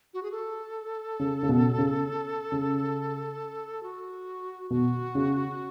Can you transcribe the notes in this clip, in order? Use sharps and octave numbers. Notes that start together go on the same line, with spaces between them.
F#4
G#4
A4
C#3
C#3
B2
C#3
C#3
F#4
B2 F#4
C#3